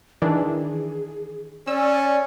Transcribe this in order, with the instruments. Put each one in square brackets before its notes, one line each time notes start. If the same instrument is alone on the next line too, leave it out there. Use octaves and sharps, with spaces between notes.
[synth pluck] D#3 E3 D4 [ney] G#4
[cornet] C#4 [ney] D5 [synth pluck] E6